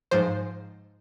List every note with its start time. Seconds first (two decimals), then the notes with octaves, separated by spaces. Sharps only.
0.11 G#2 F3 C5